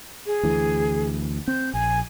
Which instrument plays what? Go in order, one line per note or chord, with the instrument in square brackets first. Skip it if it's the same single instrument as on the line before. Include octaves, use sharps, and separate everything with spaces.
[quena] G#4
[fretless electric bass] D2 E3
[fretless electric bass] C4 [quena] G6
[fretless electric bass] A#1 [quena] G#5